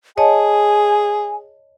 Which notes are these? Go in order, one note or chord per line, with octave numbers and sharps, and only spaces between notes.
G#4 C#5 D#5 G#5 A5